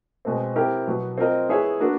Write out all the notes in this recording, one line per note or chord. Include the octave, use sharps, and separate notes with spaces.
B2 G#3 C4
C4 E4 G4 A#4
B2 F#3 B3
C4 F4 A#4 D#5
B3 E4 G#4 C#5 E5
A#3 D4 F#4 B4